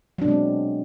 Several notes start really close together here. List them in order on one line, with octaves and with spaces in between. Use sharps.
F#3 D4 B2 G#3 C4